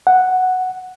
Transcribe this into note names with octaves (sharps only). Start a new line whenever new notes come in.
F#5